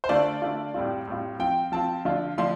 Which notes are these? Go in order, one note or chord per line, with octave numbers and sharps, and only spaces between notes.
C5
D3 A3 F4 D5
D3 A3 F4
A2 G3 C4 F4
A2 G3 C4 F4
F3 C4 F4 G5
F3 C4 F4 A5
D3 F3 D4 F4
D3 F3 D4 F4 C6